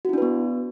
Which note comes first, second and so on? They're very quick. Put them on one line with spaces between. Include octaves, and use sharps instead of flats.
F#4 E4 D4 B4 B3